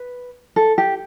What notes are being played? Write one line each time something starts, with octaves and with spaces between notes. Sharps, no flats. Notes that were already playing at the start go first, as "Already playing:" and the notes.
Already playing: B4
A4
G4